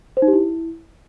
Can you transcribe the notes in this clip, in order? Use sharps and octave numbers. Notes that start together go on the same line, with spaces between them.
C5
D#4
G4
E4